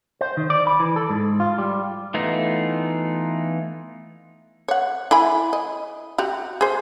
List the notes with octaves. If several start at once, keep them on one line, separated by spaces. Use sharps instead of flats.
C5
D#3
D5
B5
E3
A4
G#2
F4
G3
E3 A3 B3 D#4 F4
C#5 F#5
E4 G#5 B5
D#5
F#4 G4
G#4 C5